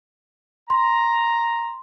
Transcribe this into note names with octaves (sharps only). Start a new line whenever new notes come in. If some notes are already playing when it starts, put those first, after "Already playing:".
A#5 C6